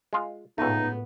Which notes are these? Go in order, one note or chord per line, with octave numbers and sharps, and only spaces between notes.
G#3 F4
C#2 A2 A3 B3 D#4